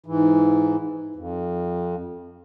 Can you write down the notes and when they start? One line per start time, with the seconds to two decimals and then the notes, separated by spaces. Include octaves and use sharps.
0.06 G#2 E3
1.16 F2